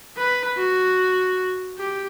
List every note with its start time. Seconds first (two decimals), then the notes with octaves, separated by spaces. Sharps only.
0.17 B4
0.57 F#4
1.78 G4